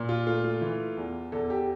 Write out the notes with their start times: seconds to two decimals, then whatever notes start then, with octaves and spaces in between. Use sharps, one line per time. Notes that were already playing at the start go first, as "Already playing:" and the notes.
Already playing: A#2
0.09 F4
0.27 A3 F4
0.44 F4
0.62 E3
0.97 E2
1.32 E2 A4
1.50 G4